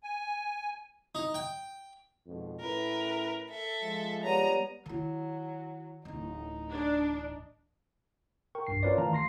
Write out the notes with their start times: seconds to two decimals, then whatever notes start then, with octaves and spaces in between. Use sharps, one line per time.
0.03 G#5
1.15 D#4
1.34 G5
2.27 F2 G#2 B2
2.60 A2 C#4 E4 A#4 B4
3.50 A4 E5
3.82 F3 G#3
4.24 G3 B3 C#5 A#5 D#7
4.86 D#3 F#3 E4
6.05 D1 A1 D#4
6.70 D4
8.55 A#4 G5 C#6
8.67 B1 G2 C7
8.83 C#4 F4 A#4 B4 C#5 D5
8.98 D#3 E3 A3 F5 A5 A#5
9.12 G#1 C6 A#6 C7